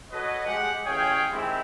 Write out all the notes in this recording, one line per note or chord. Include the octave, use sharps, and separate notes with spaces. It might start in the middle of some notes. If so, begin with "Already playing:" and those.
F#4 A4 B4 C#5 D#5
G#3 G4 F#5
A1 C#4 G#4 C#5 F5 G5
D#3 G#3 C4 E4 G4